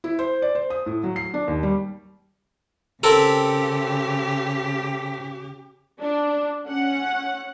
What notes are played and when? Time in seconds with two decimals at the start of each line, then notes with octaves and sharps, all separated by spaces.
0.04 E4
0.19 C5
0.42 D5
0.55 C5
0.70 D#6
0.86 A2
1.04 F#3
1.16 C7
1.34 D4
1.48 D#2
1.63 G3
3.03 C#3 C4 G4 A4 A#4
6.01 D4
6.68 C#4 F#5